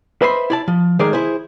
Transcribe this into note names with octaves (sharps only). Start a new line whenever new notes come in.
B4 C5 D#5 E5 B5 C6
E4 D5 A5
F3
D#3 G#3 A3 G#4 A#4 D5
E4 G#4 C5